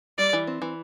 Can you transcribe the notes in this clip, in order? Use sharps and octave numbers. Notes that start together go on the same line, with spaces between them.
G3 D5
E3
C4
E3